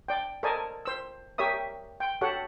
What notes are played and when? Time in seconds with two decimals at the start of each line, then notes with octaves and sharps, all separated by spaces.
0.08 D5 G5
0.43 A4 A#4 C5 D5 D#5 G#5
0.85 C5 E6
1.38 G4 A#4 C#5 E5 D#6
2.00 G5
2.21 F#4 G4 A4 C#5 F#5